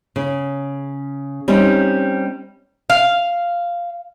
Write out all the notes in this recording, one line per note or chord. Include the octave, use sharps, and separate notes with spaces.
C#3
G3 C4 C#4 D#4
F5